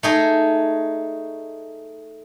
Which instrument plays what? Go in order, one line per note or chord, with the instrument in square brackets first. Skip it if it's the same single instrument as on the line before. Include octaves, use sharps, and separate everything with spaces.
[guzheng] A3 D#4 G#4